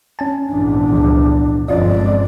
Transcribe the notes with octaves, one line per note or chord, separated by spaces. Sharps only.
C#4 G#5 A5
A#1 E2 G#2 D4
C#2 F3
G1 F2 G#3 C#4 F4 D5 D#5